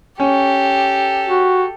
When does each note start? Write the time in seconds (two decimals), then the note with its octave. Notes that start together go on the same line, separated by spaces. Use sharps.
0.20 C#4 G4 A4
1.28 F#4